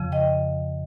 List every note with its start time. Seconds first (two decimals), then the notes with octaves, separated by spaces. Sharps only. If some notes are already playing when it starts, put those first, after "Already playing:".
Already playing: F2 C#3 F3
0.12 D#5 G5